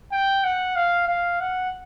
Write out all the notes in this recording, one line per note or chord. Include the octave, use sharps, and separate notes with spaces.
G5
F#5
F5
F5
F#5